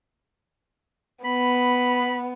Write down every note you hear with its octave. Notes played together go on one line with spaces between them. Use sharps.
B3 B5